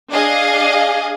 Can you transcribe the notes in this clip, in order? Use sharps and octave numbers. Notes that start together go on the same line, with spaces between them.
D4 G#4 D#5 F5